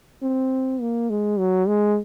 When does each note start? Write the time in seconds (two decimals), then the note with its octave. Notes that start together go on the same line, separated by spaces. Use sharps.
0.22 C4
0.81 A#3
1.10 G#3
1.39 F#3
1.68 G#3